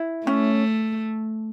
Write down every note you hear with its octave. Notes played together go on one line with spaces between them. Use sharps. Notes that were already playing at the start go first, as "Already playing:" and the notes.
Already playing: E4
A3 C#4